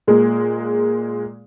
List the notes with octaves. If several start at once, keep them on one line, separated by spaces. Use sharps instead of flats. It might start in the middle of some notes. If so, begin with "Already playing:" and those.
A#2 G#3 A#3